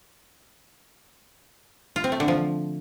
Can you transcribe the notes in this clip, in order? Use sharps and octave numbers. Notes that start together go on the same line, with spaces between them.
F4
C4
A3
D3
F3